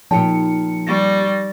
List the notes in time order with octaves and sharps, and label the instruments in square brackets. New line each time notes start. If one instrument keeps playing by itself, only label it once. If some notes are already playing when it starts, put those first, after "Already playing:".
[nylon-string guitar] A#2 G4 G5 [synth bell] F3 D#4 C#7 [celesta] A5
[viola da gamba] G3 [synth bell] C#6 A6 A#6